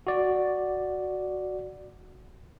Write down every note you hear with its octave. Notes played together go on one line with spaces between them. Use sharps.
F#4 D5